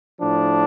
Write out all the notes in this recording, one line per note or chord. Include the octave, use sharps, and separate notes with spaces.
A2 F3 D4